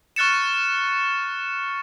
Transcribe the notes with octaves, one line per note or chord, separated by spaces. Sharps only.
C#6 F6 F#6 A6 C#7 E7